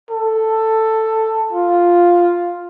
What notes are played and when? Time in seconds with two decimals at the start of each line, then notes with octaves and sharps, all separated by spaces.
0.10 A4
1.53 F4